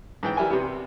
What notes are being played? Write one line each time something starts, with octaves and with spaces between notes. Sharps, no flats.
G#2 E3 G5
E3 G3 E4 A#4 G#5
C3 G3 B3